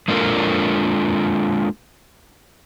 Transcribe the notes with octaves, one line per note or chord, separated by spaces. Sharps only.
G#3 A#3 D4 F4 A4 A#4